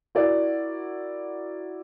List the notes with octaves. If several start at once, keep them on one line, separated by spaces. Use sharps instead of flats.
E4 F#4 A#4 D5